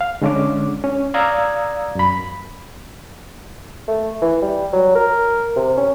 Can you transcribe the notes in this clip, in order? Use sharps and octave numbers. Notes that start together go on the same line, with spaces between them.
F5
D3 G#3 C#4 D4 D6
C#4
D5 F5 A#5 D#6 E6 G#6
F#2 B5
A3
E3
G3
F#3
A#4
C3
C#4